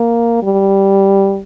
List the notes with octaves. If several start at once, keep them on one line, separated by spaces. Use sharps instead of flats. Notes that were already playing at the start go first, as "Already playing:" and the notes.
Already playing: A#3
G3